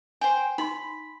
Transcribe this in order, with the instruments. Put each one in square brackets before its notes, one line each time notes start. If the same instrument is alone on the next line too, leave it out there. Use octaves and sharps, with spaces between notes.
[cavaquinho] C5 G5 [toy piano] G#5
[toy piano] D#4 C6 [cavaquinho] B5